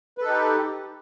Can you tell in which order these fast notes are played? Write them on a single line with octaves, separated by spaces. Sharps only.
B4 A4 D#4 G4